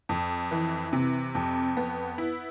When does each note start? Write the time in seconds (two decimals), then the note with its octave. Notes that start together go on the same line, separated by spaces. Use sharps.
0.09 F2
0.51 E3
0.93 C3
1.35 F2
1.77 B3
2.18 E4